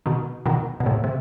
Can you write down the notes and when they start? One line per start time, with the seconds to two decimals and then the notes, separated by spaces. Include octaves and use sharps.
0.06 B2 D#3
0.46 B2 D#3
0.80 B2
0.86 A2 C3
1.04 C3